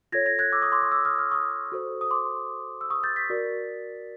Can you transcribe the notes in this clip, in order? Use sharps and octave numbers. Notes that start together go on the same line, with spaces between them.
F4 A4 C#5 G#6 A#6
G#6 A#6
F#6 G#6
D6 E6
C#6 D#6
C6 D6
C#6 D#6
D6 E6
D#6 F6
D#6 F6
C#6 D#6
F#4 A4 C5
D#6
C6 D6
E6
C#6 D#6
G6 A6
A6 B6
F#4 A#4 D5